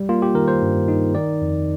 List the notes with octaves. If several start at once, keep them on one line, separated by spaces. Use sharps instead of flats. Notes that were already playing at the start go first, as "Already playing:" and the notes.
Already playing: G3
A#3 F4
G4
D#3 A#4
C5
G2
D#4
D#3 D5
F2